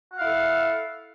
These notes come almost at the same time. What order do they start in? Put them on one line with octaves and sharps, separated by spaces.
F#5 F5 E4 A4